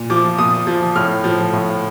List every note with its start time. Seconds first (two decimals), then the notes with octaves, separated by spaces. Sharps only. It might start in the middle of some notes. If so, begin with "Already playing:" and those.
Already playing: A#2
0.10 F3 D6
0.38 A#2 D#6
0.67 F3
0.96 A2 F6
1.24 F3
1.53 A2